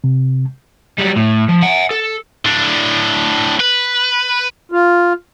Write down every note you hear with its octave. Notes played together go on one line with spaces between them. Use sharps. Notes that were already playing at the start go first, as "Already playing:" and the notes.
C3
F#3 G3
A2
F3
F#5 G#5
A4
A2 D4
B4
F4